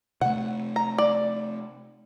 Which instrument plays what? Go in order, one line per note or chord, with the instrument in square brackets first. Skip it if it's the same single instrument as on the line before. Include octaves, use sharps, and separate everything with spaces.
[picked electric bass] C3 A3 [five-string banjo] F#5
[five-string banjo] A#5
D5